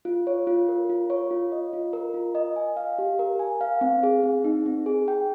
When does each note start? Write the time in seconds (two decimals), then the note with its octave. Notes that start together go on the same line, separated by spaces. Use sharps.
0.05 F4
0.27 C#5
0.47 F4
0.69 A#4
0.90 F4
1.10 C#5
1.31 F4
1.52 D#5
1.73 F4
1.93 A#4
2.14 F4
2.35 D#5
2.56 G#5
2.77 F5
2.99 G4
3.19 A#4
3.39 G#5
3.61 F5
3.81 C4
4.03 G#4
4.23 C4
4.44 D#4
4.66 C4
4.86 G#4
5.08 G5